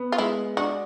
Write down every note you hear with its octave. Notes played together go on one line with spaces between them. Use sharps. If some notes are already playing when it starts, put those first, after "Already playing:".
Already playing: B3
F4
G#3 E4
D4 F#4